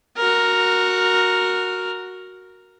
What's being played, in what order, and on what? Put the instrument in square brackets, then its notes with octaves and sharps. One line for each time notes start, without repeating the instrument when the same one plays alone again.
[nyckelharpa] F#4 A#4